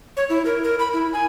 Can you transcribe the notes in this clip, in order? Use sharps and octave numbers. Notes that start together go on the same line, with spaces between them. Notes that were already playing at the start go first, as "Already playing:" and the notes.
C#5
E4
A#4
A#4
B5
E4
G#5